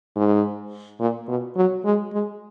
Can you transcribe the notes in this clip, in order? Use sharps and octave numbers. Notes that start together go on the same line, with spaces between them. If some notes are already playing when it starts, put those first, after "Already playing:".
G#2
A#2
B2
F#3
G#3
G#3